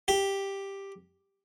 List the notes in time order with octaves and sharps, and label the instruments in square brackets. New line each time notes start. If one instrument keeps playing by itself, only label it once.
[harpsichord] G4